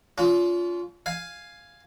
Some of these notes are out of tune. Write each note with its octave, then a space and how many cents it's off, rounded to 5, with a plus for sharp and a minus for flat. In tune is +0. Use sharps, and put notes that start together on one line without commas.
C#4 +45 F4 +0
F5 +0 G#5 +0